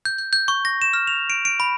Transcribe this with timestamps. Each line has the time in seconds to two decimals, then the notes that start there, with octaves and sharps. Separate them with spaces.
0.05 G6
0.18 G6
0.33 G6
0.48 C#6
0.65 A#6
0.82 E7
0.93 F6
1.07 F7
1.30 D7
1.45 D7
1.60 B5